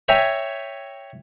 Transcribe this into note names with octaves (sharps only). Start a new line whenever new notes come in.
C#5 E5 G5 G#5 A#5